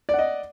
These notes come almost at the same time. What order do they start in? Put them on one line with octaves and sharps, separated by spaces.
D5 F#5 D#5